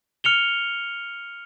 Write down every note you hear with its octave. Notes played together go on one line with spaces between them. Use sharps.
F6 C#7 F7 G7